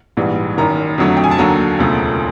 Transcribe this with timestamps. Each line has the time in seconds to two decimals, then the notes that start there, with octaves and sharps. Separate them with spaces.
0.17 A#1 G#2 E3 G3
0.58 F#1 F#2 D#3 A#5
0.98 F2 D3 F#3 A3
1.17 G5
1.24 G#5
1.31 A5
1.38 D#2 D3 F#3 A#5
1.79 E1 D2 C#3 F3 A3